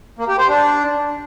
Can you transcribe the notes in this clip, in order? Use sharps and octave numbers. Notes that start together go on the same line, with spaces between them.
A#3
G4
C5
D4